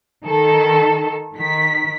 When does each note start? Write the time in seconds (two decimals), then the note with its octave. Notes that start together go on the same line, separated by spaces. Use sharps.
0.24 D#3 A4
1.35 D#3 B6